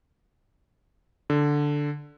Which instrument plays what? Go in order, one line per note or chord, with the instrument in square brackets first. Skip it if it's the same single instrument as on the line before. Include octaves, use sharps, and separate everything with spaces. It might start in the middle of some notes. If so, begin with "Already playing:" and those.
[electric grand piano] D3